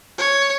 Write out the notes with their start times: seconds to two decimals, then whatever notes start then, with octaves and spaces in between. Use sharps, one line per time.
0.18 C#5